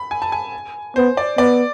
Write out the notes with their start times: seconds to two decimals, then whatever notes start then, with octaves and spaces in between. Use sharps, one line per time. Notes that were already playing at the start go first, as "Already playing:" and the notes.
Already playing: B5
0.11 G#5
0.22 A5
0.32 G#5
0.96 B3 C5
1.17 D5
1.38 B3 D5